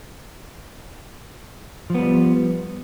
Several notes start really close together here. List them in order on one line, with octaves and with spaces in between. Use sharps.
F3 B3 G3